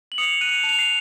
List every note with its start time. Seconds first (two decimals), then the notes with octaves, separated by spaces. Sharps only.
0.12 F#7
0.18 D#6 C#7 F7
0.41 F#6 D#7
0.49 C#7 F7
0.64 A5
0.69 F7
0.79 C7 D#7